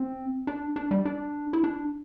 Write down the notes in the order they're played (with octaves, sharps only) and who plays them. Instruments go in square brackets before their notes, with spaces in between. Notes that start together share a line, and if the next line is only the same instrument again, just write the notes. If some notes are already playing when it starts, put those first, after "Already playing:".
Already playing: [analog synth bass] C4
D4
D4
G3
D4
E4
D4